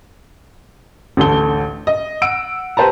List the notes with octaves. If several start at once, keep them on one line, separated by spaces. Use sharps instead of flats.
A1 D2 A4 G7
D#5
F#5 E6 D7
G4 B4 C5 A5 A#5